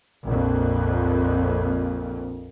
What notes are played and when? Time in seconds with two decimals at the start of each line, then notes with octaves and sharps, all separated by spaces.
0.24 A#1 F2